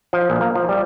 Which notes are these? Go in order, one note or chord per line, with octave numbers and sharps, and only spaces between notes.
F3
A#1
A#3
F3
G3